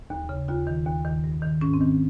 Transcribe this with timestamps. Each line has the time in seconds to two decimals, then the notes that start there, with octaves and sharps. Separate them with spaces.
0.10 D#2
0.29 C#3
0.48 D#2 F4
0.67 D#3
0.86 D#2
1.05 D#3
1.24 G2
1.42 D#3
1.61 G#2 C#4
1.74 C4
1.80 D#3